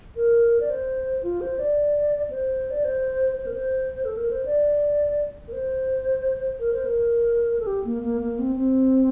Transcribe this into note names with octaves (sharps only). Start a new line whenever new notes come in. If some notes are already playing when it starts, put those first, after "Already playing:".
A#4
D5
C5
F4
C5
D5
C5
D5
C5
C5
A#4
C5
A4
A#4
C5
D5
A#4
C5
A#4
C5
A#4
A4
G4
A#3
A#3
A#3
C4
C4